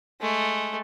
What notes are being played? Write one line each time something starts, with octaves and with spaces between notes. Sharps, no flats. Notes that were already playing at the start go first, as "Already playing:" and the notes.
G#3 A3